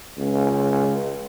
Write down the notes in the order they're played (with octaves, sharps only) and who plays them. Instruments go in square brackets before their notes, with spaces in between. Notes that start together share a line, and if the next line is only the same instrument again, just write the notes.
[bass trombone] C#2